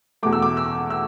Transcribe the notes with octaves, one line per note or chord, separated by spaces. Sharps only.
E2 B2 A3 D6
E6
D6
E6
E6